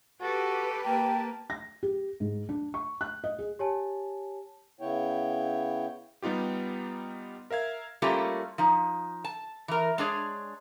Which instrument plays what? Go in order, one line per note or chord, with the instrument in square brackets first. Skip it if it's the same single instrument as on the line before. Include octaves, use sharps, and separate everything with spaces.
[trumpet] F#4 [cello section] G4 B4 [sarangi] A4
[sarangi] A#3 [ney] G5 [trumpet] A5
[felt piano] A#6
G4
G#2
D4
C#6
F#6
D#5
G#4
[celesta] G4 C#5 G#5 A5
[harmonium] C#3 B3 E4 C#5 G5
[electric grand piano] G3 B3 D#4 F4 G4
A#4 E5 F5 G#6
[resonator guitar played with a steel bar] G3 A3 A#3 C#4 F4 G4
F3 D#4
A5
E3 A#4
G#3 D4 G#4 C#5 D5